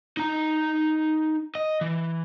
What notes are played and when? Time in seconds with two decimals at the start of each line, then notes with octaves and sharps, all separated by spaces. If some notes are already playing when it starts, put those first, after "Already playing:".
0.17 D#4 A#5
1.55 D#5
1.81 E3